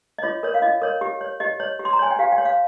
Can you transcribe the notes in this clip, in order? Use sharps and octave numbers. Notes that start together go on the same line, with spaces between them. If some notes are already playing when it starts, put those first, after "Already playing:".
D#5
F4 C#5
A#4 C#5
F5
F4 D#5
A#4 C#5
G4
C#5
G4 D#5
C#5
G4
C6
A#5
C#5 G#5
G5
G4 F5
G5
C#5
F5